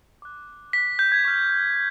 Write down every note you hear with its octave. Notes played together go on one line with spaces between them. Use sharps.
D6 F#6
D6 F#6 B6
G6
G#6
C#6 F6